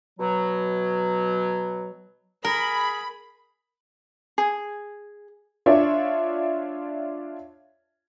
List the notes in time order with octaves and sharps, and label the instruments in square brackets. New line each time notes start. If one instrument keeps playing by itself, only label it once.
[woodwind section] B2 F#3
[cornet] G#4 [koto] A#4 [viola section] B5
[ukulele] G#4
[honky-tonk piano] D4 F4 C#5 D5 E5